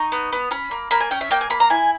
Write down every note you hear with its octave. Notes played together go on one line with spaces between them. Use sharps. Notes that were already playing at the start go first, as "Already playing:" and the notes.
Already playing: D#4 C#6
B3
B3
C#4 B5
A#3
A#3 B5
G#5
C#4 G5
E5
A#3 G5
G#5
A#3 B5
A#5
E4 G#5